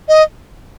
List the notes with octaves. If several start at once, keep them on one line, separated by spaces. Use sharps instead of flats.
D#5